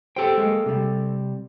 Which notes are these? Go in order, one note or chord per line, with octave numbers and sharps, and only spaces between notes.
G4 A4 C5 G5
G#3 A#3
C3 G3